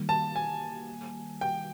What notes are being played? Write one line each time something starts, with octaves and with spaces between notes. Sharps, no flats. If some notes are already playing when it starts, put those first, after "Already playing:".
Already playing: D#3 G3 A#3
A5
G#5
G5